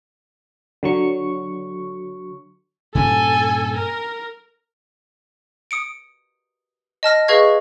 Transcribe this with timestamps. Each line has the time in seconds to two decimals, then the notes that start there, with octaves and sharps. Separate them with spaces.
0.83 D3 F#3 C#6
2.95 G2 A#2 C#4 A4 G#5
3.76 A#4
5.71 D#6 C#7 D7
7.03 D#5 A5 F6 A#6
7.28 G#4 B4 D#5 F5 C#6 G#6